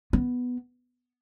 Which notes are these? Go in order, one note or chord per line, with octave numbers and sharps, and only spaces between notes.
B3